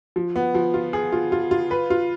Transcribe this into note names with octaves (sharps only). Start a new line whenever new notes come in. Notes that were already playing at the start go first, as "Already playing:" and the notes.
F3
B3
F3
F4
G#4
F4
F4
F4
B4
F4